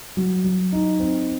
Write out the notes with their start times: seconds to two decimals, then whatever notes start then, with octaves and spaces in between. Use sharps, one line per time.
0.17 F#3
0.44 F#3
0.72 D#4
0.99 C4